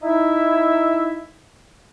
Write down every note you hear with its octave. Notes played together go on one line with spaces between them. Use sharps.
D#4 E4 E5